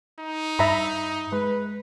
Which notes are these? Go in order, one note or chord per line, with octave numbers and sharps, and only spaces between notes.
D#4
G2 E5 A#5 B5
G#3 B4